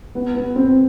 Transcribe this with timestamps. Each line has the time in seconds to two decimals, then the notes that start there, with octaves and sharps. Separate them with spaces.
0.15 B3
0.35 B3
0.56 C4